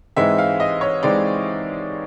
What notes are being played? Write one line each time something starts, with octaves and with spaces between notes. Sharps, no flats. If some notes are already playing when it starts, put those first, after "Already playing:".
G#2 E3 G#3 C4 D#4 E5
F5
D#5
C#5
E3 G#3 C4 D#4 D5